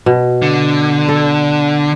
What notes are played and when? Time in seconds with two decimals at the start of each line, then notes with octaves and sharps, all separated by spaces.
0.06 B2
0.42 D3
1.09 A4